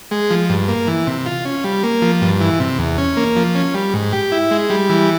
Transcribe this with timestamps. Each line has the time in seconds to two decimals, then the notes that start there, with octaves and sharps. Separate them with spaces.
0.11 G#3
0.30 F3
0.49 G2
0.68 A#3
0.87 E3
1.07 C3
1.26 F4
1.45 C#4
1.64 G3
1.83 A#3
2.02 F3
2.21 G2
2.41 E3
2.60 C3
2.79 E2
2.98 C#4
3.17 A#3
3.36 F3
3.55 C#4
3.74 G3
3.94 G#2
4.13 G4
4.32 E4
4.51 G#3
4.70 G3
4.89 E3